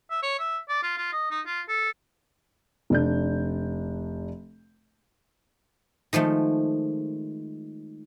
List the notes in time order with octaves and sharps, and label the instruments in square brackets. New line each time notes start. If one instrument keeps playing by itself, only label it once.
[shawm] E5
C#5
E5
D5
F4
F4
D#5
D#4
F4
A4
[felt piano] F1 D4 G6
[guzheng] D#3 F3 G#3 A3